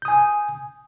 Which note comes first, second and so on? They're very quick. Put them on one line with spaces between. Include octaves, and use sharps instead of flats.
G6 D#6 G#5